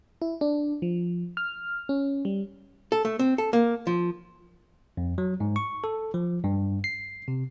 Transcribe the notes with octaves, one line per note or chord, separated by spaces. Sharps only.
E4
D4
F3
F6
C#4
G3
A4
A3
C4
A4
A#3
F3
F2
F#3
G#2
C#6
A4
F3
G2
C7
C3